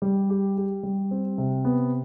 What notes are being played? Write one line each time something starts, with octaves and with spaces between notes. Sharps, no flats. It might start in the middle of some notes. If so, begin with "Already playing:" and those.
G3
G4
G4
G3
C4
C3
B3